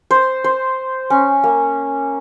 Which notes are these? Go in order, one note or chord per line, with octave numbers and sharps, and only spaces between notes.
C5
C5
C#4
A#3